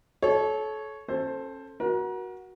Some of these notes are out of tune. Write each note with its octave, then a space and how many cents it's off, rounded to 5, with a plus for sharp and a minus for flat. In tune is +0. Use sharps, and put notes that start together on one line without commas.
A4 -30 C#5 +0
C#4 -35 A4 +0 C5 +5
F#4 +0 A#4 +35